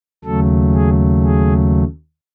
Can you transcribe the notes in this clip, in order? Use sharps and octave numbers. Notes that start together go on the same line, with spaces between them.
D#2 C#3 F#3 A3 A4
G#4
G#4